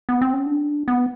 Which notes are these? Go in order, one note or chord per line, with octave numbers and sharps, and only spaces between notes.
B3
C4
C#4
D4
B3